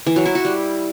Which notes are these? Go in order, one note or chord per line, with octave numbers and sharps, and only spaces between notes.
E3
F#3
E4
F#4
G3